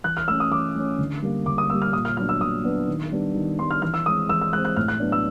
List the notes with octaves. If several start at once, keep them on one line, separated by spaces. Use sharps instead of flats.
E3 F#6
F6
A3 C#4 E6
D#6
E3 D6
A3 C#4
D3
G3 A#3
D3 D6
D#6
G3 A#3 E6
F6
A#2 D#6
F6
F#3 B3 D4 F6
E6
A#2 D#6
F#3 B3 D4
D#3
G3 B3 D4
D#3
G3 B3 D4 C6
F6
E3 F6
E6
G#3 C4 D#6
E3 E6
E6
G#3 C4 F#6
F#6
A2 F6
F#6
F#3 B3 D4
E6